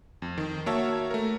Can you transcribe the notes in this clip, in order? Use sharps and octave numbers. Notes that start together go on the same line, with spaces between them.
F2
D#3
A#3 F#4 C#5 E5 A5
A3 A#4